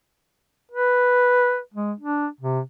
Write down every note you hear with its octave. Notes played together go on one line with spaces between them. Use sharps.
B4
G#3
D4
C3